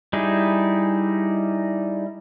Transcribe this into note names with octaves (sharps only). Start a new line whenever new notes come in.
G3 D#4 E4 G#4